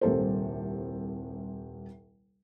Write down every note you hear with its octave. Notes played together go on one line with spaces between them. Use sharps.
D#1 C2 C3 A4 A#4 C5